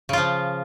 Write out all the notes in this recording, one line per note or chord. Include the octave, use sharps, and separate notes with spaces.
C#3 F3 F4